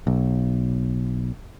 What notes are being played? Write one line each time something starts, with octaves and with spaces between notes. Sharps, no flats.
B1